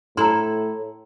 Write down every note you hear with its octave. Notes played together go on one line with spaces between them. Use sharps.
A2 E4 A4 A#5 C6